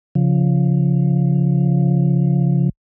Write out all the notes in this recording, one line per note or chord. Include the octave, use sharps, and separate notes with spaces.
C#3 F3